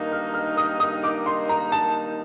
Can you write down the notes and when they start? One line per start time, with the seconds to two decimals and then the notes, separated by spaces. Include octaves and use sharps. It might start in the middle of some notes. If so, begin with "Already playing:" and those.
Already playing: G2 D#3 A#3 D#4
0.12 F6
0.34 F6
0.57 D#6
0.80 D#6
1.04 D6
1.26 C6
1.49 A#5
1.72 A5